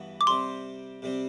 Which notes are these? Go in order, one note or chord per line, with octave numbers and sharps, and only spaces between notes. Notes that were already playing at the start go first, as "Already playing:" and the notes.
Already playing: G2 E3 B3 F#4
D6
C3 G3 C4 G4 C6
C3 G3 C4